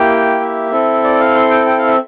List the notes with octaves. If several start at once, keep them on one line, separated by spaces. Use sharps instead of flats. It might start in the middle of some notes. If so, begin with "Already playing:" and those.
Already playing: A#3 E4 G4 G5
E5
C4 E4 A4
D5
F5
C6
G5
G5
F5
E5